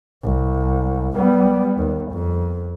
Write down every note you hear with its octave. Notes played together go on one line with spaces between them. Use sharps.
C2
G3 B3
D#2
F2